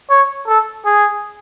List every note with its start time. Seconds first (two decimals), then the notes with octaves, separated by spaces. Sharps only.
0.10 C#5
0.47 A4
0.86 G#4